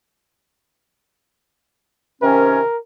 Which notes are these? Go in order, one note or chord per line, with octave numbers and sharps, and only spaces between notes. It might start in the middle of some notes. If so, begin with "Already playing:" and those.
C3 D#3 C#4 A#4